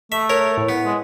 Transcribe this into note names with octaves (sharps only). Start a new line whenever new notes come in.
A3 E5
A#4 C#5
A2
B3
G#3